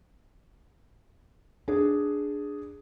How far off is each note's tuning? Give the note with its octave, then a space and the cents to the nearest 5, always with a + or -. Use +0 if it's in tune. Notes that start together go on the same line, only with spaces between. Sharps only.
D4 +0 G#4 +0